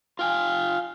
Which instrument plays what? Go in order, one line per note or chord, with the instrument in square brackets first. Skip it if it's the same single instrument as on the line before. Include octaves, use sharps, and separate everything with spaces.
[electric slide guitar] F4 G5 G#5 [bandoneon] F5